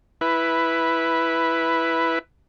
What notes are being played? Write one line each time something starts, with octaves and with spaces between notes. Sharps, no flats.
E4 B4